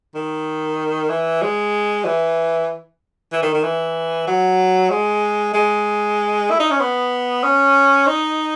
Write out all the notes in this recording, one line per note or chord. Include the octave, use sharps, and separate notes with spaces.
D#3
E3
G#3
E3
E3
D#3
D#3
E3
F#3
G#3
G#3
E4
D#4
C#4
B3
C#4
D#4